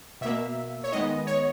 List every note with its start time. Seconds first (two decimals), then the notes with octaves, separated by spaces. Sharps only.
0.21 B2 A#3 E5
0.84 C#5
0.92 D#3 G#3 B3 D#5
1.27 C#5